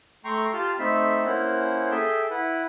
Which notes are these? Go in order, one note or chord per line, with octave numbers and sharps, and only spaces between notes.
A3 G5 A#5 C6 C#6
F4 G4 A5 C6 F6
A3 C4 D#4 A4 E5 B5
A#3 C#4 E4 C5 F#5
G#4 A4 E5 G5
E4 B4 F#5